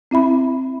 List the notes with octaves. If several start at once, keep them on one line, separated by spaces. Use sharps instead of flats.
C4 E4 E5 B5